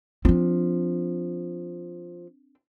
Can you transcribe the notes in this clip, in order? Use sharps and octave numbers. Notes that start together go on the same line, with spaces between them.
F3 C4 D4